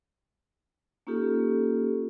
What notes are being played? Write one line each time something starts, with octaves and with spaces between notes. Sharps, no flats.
A#3 C#4 D#4 F4 G4 A4